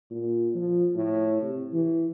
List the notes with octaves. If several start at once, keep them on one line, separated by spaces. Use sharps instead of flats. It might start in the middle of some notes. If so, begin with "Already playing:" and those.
A#2
F3
A2
C3
E3